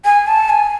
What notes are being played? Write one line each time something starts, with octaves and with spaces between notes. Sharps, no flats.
G#5
A5
G#5